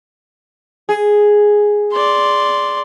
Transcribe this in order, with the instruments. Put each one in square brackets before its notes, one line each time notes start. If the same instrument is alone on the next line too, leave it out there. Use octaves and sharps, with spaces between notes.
[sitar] G#4
[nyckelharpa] D5 C6